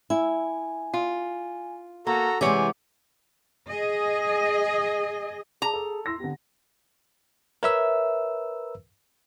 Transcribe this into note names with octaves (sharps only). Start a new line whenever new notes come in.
E4 G#5
F4
A#3 F#4 A4 A#5
C3 E3 G#3 G4 C#5 F#5 G#5 D6
G#4 D#5
G#4 A#5
A4
E4 C6 E6 A#6
D3 B3 G4
A#4 B4 C#5 E5 E6